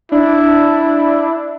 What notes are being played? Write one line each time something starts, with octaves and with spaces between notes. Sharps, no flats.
D4 E4